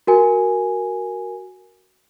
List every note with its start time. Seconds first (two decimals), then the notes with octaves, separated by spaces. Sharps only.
0.07 F#4 A#4 G#5